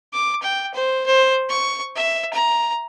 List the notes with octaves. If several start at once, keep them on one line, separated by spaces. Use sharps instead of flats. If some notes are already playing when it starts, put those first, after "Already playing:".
D6
G5
C5
C5
C#6
E5
A#5